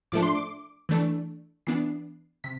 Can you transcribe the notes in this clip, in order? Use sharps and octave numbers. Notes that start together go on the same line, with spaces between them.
A2 F3 A3 D4 D6
C6
D6
E3 A3 D4
E3 B3 D4 C7
C3 B6